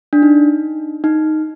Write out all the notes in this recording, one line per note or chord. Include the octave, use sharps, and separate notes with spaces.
D4
D#4
D#4